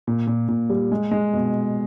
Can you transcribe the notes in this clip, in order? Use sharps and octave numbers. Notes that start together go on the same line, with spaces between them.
A#2
A#2
A#2
G3
G#3
G#3
B2